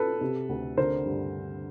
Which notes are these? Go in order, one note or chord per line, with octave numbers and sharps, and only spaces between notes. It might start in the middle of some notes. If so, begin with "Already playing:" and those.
Already playing: A4 B4
C3
D2
D3 A#4 C5
G2